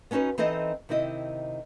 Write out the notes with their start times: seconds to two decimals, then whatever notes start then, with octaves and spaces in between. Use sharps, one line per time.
0.11 B3 C#4 D#4 F#4 B4
0.38 E3 C4 D#4 A4 C5 D#5
0.89 C3 D#3 C4 E4 D#5